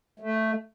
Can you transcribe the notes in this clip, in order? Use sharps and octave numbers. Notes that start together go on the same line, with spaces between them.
A3